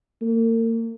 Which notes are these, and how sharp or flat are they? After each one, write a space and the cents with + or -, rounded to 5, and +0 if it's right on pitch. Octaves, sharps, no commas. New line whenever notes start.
A#3 -40